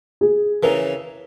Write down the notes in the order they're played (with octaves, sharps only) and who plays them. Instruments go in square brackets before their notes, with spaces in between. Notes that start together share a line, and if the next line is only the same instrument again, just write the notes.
[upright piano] G#4
[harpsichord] C#3 E3 [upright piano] A#4